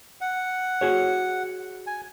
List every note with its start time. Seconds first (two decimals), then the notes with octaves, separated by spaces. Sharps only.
0.21 F#5
0.81 F#4 G#4 C#5
1.87 G#5